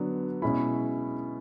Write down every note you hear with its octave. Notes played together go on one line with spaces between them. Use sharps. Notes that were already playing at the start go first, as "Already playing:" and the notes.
Already playing: D3 F#3 B3 D4
B2 G#3 C#4 E4 B5